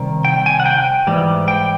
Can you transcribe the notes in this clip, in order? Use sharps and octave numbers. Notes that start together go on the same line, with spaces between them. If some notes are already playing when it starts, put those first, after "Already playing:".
Already playing: C3 D#3 G3
G5
G#5
F#5
G5
G#2 E3 G3
G5